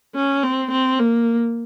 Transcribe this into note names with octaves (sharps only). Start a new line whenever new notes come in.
C#4
C4
C4
A#3